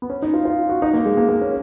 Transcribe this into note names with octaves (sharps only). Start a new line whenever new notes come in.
B3
C#4
D#4
F4
F4
F#4
D#4
A#3
G#3
A#3
A#3
C#4